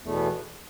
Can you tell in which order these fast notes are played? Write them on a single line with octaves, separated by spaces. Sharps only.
E2 A3 B2 E3